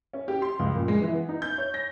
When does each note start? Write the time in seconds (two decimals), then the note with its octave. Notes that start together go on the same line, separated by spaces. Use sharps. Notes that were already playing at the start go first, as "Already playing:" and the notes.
0.13 C#4
0.28 G4
0.42 C6
0.59 C#2
0.75 A#2
0.88 G#3
1.01 E3
1.14 B3
1.29 D#4
1.42 G6
1.58 C#5
1.74 A#6